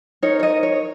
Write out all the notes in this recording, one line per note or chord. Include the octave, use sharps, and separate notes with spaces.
D#4 A#4 C#5
C#5
D#5
C#5